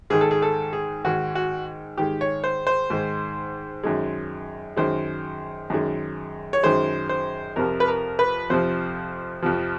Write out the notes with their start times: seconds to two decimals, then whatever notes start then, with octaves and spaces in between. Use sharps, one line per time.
0.10 G#2 D#3 G#3 G#4
0.21 A4
0.31 G#4
0.42 A4
0.73 G#4
1.04 G#2 D#3 G#3 F#4
1.35 F#4
1.98 G#2 D#3 G#3 G4
2.21 C#5
2.44 C5
2.67 C5
2.90 G#2 D#3 G#3
3.83 F#2 D#3 G#3
4.76 F#2 D#3 G#3 C5
5.70 F#2 D#3 G#3
6.53 C#5
6.63 F#2 D#3 G#3 C5
7.09 C5
7.56 F2 C3 F3 A#4
7.80 B4
7.88 A#4
8.19 B4
8.50 F2 C3 F3 C5
9.42 F2 C3 F3